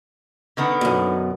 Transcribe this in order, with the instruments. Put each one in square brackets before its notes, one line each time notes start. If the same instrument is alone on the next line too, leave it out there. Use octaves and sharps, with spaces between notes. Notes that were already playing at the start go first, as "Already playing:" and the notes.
[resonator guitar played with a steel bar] D3 D#3 B3
[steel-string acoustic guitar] F#2 B2